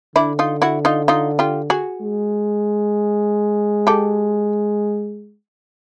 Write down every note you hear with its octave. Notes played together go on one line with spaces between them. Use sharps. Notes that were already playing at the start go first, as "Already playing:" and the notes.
D3 D4 E4
D#4 F4
E4 F#4
D#4 F4
D#4 F4
F4 G4
F#4 G#4
G#3
G4 A4